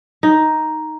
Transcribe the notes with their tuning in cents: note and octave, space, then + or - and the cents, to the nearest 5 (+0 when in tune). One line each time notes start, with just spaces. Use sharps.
D#4 +5